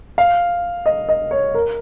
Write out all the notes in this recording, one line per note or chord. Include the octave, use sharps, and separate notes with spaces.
F5
D#5
D#5
C#5
A#4